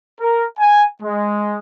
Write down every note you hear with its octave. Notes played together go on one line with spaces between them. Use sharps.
A#4
G#5
G#3